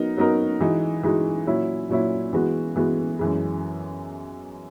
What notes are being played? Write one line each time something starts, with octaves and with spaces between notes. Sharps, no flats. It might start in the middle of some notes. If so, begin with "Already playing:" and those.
Already playing: F#3 B3 D#4 A#4
F#3 B3 D#4 F#4 A#4
E3 G#3 D#4 F#4
E3 G#3 D#4 F#4
A#2 F#3 C#4 E4
A#2 F#3 C#4 E4
E3 G#3 B3 F#4
E3 G#3 B3 F#4
F#2 E3 G#3